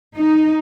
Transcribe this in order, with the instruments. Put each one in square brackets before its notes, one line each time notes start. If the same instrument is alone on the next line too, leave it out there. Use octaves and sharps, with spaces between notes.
[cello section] D#4